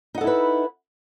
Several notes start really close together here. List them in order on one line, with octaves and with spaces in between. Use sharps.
D#4 F#5 A4 E4 B4